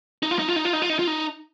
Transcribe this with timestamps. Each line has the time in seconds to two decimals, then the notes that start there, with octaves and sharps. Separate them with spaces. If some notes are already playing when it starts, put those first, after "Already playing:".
0.23 D#4
0.31 F4
0.39 D#4
0.48 F4
0.56 D#4
0.65 F4
0.73 D#4
0.82 F4
0.89 D#4
0.99 F4
1.07 D#4